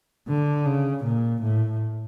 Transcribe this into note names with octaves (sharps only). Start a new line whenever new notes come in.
D3
C#3
A#2
A2